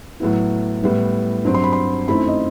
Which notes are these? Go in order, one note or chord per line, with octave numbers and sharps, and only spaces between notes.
A2 F#3 B3 E4
A2 G3 B3 E4
G2 F#3 C4
C6
B5
C6
F#2 D#3 A3 C4 E4 B5
D#5